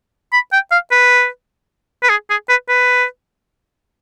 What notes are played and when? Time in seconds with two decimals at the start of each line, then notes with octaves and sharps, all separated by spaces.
0.33 B5
0.53 G5
0.72 F5
0.92 B4
2.03 B4
2.10 G#4
2.30 G#4
2.49 B4
2.69 B4